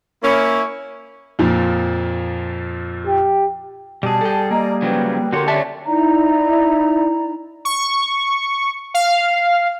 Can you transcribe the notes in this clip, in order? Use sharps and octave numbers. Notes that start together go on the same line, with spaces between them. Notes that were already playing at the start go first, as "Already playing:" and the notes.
A#3 C#4 E4
F2 A#2 F3
G4
B2 G3 G#4 A5
A4 G5
A#3 D5 D#5 A#5
C#3 F3 F#3 B4 G5
D3 F#4 G4 A4 A#4 C#5 C6
C#4 D4 D5 E5 A5
D#4 E4 D5 A#5
C#6
F5